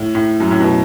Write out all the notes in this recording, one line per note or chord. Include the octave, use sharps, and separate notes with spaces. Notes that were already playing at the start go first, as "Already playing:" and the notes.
Already playing: A2
A2
F#2
A2
B2